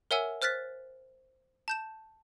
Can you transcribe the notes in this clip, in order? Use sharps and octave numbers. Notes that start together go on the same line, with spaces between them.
A#4 C#5 E5 F#5 G#5 E6
C5 F6 F#6 A6 B6
A5 G6 E7